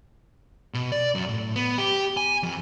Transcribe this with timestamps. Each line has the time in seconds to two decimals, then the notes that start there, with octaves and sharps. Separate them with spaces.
0.74 B2
0.92 D5
1.15 F#2
1.29 A2
1.55 B3
1.78 G4
2.17 G#5
2.43 F2